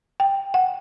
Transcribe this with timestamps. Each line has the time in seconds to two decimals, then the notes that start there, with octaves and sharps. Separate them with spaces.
0.20 G5
0.54 F#5